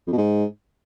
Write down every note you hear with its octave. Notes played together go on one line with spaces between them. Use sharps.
F2
B2
G#2